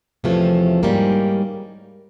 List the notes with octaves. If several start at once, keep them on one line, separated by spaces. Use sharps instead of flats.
E2 C3 F3 A3 C#4
G#2 D#3 G3 A#3 C#4